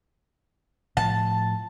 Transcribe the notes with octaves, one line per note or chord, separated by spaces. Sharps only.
A2 F3 A5